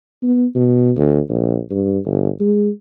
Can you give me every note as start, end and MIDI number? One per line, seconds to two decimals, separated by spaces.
0.23 0.46 59
0.55 0.92 47
0.97 1.20 38
1.30 1.59 34
1.71 1.99 43
2.05 2.29 31
2.40 2.70 56